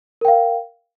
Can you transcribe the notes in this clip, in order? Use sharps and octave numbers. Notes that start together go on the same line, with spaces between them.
A#4 F5 G5